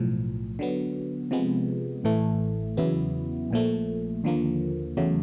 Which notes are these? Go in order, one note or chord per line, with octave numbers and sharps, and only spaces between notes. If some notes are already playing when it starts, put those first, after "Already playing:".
Already playing: B1 A2 F3
D3 F#3 B3
C3 F3 G#3 B3
A1 A2 E3 A3
E2 C#3 F#3 B3 E4
A#1 A#2 F3 A3
D#2 D3 F3 A#3
E2 C#3 F#3 A3